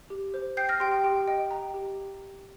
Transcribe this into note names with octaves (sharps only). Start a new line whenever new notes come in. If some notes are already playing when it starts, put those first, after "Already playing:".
G4
C5
G5 G6 C7
F6 A#6
G4 G5 C6
G5
G4 G5
D#5 G5
G5 A#5
G4